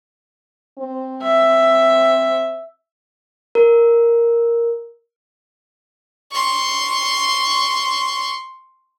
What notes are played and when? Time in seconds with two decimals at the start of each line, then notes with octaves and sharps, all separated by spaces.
0.79 C4
1.23 E5
3.55 A#4
6.32 C6 C#6